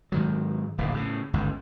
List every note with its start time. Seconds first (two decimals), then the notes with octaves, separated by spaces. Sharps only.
0.12 G#2 D#3 F#3
0.78 D1 A#1 G#2
0.94 A2 C#3
1.33 G1 C#2 G#2